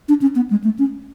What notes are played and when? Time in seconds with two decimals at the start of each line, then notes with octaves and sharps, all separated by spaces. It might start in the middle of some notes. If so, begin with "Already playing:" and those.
0.09 D4
0.22 C#4
0.36 B3
0.50 G#3
0.64 A3
0.79 C#4